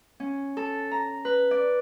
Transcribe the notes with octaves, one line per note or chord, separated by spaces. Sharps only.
C#4
A4
A#5
B4
D5